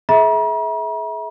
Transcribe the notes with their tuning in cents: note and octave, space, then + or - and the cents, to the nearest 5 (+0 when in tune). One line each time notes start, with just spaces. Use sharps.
G#4 +40 E5 -25 A#5 +45